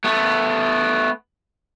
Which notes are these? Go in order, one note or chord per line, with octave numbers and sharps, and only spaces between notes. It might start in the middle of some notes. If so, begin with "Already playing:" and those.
A3 B3